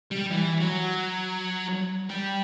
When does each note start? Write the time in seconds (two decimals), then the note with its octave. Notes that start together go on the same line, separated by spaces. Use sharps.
0.11 G3
0.31 E3
0.60 F#3
2.10 G3